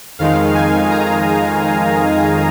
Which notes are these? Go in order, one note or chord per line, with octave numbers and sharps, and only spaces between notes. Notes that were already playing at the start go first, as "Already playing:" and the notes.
F2 D#3 G#3 D#4 F5
G#5
A#5